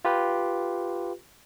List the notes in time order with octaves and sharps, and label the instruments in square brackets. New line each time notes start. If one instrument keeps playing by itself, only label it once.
[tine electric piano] F4 G4 B4